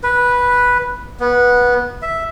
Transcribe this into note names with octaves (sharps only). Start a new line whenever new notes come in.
B4
B3
E5